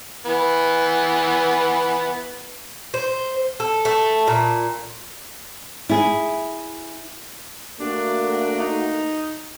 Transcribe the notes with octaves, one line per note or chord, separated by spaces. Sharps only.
E3 B3
C5
A4
A3
A#2
E4 G#4
A3 A#3 D4 F#4
D#4